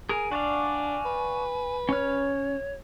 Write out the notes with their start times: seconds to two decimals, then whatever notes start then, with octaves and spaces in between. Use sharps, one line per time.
0.09 G#4 A#4 G#5
0.31 D4 F#4 D5 F5
1.05 B4
1.89 C#4 C#5 F6